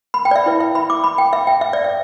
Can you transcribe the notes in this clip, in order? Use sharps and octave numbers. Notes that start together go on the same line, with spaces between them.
B5
G5
D5
E5
E4 B4
E5
B5
D6
B5
G5
E5
G5
E5
D5
E5